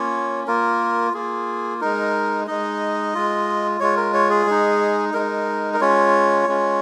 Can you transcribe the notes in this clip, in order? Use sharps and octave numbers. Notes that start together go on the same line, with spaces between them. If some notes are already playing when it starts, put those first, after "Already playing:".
Already playing: A#3 C#4 F4 C#5
A#3 F4 A#4
A#3 F4 G#4
G#3 D#4 A#4
G#3 D#4 D#5
G#3 F4
G#3 F4 C#5
A#4
C#5
G#4
G#3 D#4
G#3 D#4 A#4
A#4
G#3 C#4 F4 C#5
G#3 C#4 F4